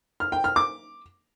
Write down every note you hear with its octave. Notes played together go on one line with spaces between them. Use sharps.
F6
G5
F6
D6